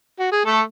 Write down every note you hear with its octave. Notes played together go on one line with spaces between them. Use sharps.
F#4
G#4
A3 A4